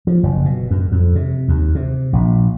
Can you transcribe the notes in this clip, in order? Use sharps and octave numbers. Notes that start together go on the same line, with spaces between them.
F3
F#1
B2
F#2
F2
C3
D#2
C3
A#1